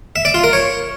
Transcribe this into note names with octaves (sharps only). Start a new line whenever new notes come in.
E5
D5
F4
A#4
C#5